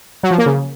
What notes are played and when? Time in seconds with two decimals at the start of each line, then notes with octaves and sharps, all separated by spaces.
0.23 F#3
0.31 F3
0.38 A#3
0.46 C#3